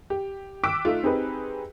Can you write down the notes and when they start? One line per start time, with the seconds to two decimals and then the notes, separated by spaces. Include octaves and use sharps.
0.10 G4
0.63 G5 D6 E6 F#6 B6 D7
0.85 A3 D#4 F4
1.03 C4 D#4 G4 G#4 B4